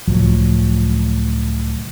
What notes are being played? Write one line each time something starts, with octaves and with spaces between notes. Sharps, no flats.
C#2 A2 F3 F#3